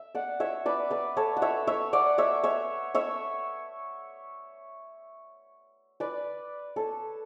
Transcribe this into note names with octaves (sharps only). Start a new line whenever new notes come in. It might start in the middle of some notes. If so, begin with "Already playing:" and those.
Already playing: E5
D5 F#5
C#5 E5
B4 D5
B4 D5
A4 C#5
F#5
C#5 E5
C#5 E5
D5 F#5
C#5 E5
C#5 E5
C#5 E5
B4 D5
A4 C#5